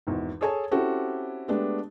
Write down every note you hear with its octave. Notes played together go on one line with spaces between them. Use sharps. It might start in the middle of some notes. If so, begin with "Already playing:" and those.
G#1 E2
G#4 A4 C#5 G#5 A5
C4 C#4 E4 F#4 G4 A4
G#3 A3 B3 D4 G4